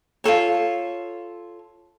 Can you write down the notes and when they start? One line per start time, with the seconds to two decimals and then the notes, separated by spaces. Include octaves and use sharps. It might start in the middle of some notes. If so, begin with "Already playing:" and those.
0.24 F4 G#4 A4 C#5